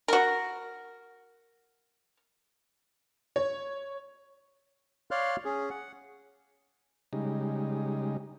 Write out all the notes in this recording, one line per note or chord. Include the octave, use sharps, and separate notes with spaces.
F#4 A#4
C#5
C#5 D5 F5 C6 F6 F#6
C#4 G#4
F#5
C#3 G3 G#3 D#4